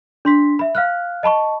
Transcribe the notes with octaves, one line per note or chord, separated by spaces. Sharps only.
D4 C6 B6
E5 B5
F5 F6 F#6
D#5 A5 B5 C#6